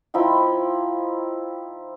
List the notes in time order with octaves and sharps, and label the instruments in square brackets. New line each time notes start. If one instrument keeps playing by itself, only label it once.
[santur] F3 D#4 E4 G5